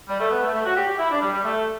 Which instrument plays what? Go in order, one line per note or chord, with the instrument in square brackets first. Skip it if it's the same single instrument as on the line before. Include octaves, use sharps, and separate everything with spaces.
[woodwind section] G3
A3
B3
A3
A3
F#4
G4
G4
E4
D4
G3
G3
A3